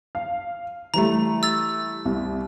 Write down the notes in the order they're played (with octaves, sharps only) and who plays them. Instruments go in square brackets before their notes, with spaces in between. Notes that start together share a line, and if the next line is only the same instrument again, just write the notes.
[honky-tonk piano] F5
[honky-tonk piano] E3 G3 A3 [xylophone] A#5
[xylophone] E6 A6
[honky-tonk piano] C2